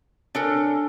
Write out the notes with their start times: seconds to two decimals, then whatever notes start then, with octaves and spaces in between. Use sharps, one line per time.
0.35 D4 A4 A#4 C#5 G#5